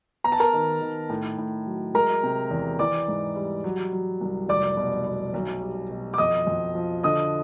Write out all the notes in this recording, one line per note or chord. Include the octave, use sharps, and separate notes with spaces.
B3 A#5
A5
A#4 A#5
D#3
D#3
A2
A2
F#3
G#3 A#4 A#5
C3
E2
E3 D5 D6
G#2
G3
F#3
F#3
C2
F1 D5 D6
B2
B2
B1
G3
B2
D6
F2 D#5 D#6
F2
F3
D3 D#5 D#6